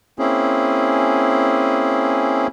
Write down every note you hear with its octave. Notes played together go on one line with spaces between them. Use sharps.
A#3 C4 C#4 E4 G#4